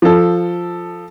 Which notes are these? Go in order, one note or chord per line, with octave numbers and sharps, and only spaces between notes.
F3 A4